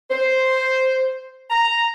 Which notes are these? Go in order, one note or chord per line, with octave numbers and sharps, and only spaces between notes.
C5
A#5